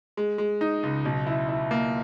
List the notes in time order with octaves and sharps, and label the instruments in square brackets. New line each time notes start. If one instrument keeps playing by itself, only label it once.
[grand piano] G#3
G#3
D#4
C#2
B1
E4
E4
A#3